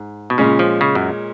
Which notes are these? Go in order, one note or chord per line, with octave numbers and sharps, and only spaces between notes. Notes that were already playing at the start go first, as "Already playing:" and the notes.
Already playing: G#2
B2
A#2 C#3 G#3 C#4
F3
C#3
F#2